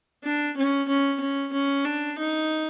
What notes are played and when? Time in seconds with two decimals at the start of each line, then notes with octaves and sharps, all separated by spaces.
0.24 D4
0.57 C#4
0.88 C#4
1.20 C#4
1.53 C#4
1.85 D4
2.18 D#4